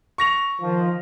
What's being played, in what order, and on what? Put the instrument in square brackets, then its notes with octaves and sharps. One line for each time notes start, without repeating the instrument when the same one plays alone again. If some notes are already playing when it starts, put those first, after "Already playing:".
[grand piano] C#6 A#6 F7
[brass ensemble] D#3 F3